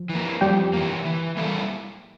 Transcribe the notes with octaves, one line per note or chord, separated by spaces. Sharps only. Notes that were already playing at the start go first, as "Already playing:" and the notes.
Already playing: F3
E3 A#3
F2 G3 G4
E3 A#3
E3
G3 A#3 E4 A4